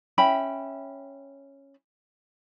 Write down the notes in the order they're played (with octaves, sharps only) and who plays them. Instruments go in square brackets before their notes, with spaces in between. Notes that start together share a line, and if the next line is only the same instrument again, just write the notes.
[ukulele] C#4 E5 G5 B5